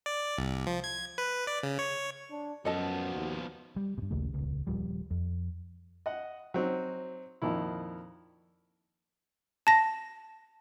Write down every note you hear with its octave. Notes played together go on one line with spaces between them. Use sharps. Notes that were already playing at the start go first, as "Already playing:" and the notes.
D5
C2
F3
G#6
B4
D5
C#3
C#5
D4
F#2 F3 B3 F#4 A4 D#5 A5
D#2
G3
G2 B2
A#1 D#2 C#3 A3
D#1 C#2
D#1 C2 F3 G3
F2
D#5 F#5
F#3 C4 D#4
F2 A#2 D#3 E4
A5 A#6